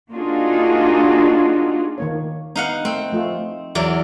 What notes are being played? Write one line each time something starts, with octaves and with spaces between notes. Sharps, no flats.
A#3 D4 D#4 F4 F#4 G#4
D#3 A#3 C#5
B3 D#4 F5 F#5
A3 C4
F3 A3 F4
E2 F#3 D5